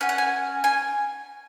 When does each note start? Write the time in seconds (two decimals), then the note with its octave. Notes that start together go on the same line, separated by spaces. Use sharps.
0.01 C#4 F#4 G#5
0.09 F#5
0.18 G#5
0.64 G#5